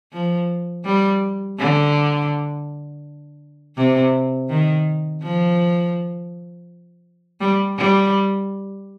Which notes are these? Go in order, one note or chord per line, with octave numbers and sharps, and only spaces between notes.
F3
G3
D3
C3
D#3
F3
G3
G3